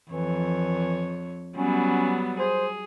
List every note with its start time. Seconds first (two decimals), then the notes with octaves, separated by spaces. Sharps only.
0.11 F2 E3 C#5
1.57 F#3 G3 B3 C#4
2.39 G#4 C5